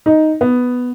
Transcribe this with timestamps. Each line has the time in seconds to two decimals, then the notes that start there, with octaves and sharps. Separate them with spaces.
0.06 D#4
0.41 B3